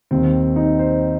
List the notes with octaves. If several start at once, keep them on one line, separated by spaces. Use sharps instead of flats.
D#2 D#3 C4
D#4
C5